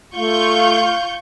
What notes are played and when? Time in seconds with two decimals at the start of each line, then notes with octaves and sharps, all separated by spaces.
0.15 A3 F4 F5 C#6 G6